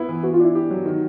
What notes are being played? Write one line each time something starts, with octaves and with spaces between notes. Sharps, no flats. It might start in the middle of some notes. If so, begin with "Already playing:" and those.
Already playing: B3 E4
E3
B3 F#4
F4
D4 E4
G4
F#3
D#3